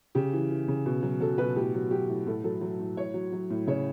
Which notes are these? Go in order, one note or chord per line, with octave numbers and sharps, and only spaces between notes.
C#3 G4
E3
E3
C#3
B2
F#3
F#3 A4
B2 B4
A2 G4
F#3
F#3 G4
A2
A2 A4
F#3 A4
F#3
A2
A2 C#5
F#3
F#3
A2
C#3 C#5